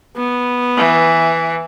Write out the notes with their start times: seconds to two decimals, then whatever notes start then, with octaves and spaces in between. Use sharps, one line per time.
0.17 B3
0.77 E3